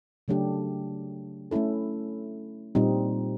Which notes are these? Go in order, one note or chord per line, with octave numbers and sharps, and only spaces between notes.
C#3 F#3 A3 D4 G4
A3 C#4 E4 A4
A#2 G3 C4 D#4